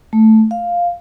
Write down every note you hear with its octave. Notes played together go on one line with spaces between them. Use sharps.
A3
F5